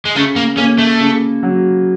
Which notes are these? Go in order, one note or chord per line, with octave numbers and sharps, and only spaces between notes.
G#3
C#3 A3
A#3
A#3 C#4
A3
C#3
F#3